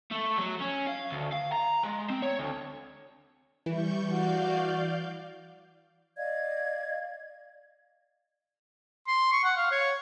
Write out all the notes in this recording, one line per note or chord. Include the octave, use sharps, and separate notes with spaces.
A3
F#3
C#4
F5
D2
F5
A#5
G#3
C4
C#5
D2
E3 G3 C#6 G6
F#4 D5 F5 G6
D5 D#5 F5 G#6
C6
C#6
F#5
F5
C#5